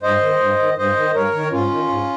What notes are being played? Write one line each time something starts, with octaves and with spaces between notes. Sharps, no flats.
G2 C5 D#5
D#3
G2
D#3
G2 C5 D#5
D#3
G2 A#4 C#5
D#3
G#2 C#4 F4
D#3
G#2